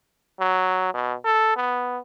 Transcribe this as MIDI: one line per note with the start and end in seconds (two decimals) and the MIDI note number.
0.40 0.93 54
0.94 1.14 47
1.25 1.56 69
1.56 1.98 59